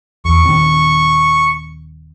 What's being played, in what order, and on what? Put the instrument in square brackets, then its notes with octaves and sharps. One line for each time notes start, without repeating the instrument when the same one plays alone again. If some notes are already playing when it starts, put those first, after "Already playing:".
[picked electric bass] E2 [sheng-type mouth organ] C#6
[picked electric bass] D#1 D#3 C4